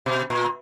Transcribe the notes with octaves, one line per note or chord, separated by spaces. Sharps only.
B2
A#2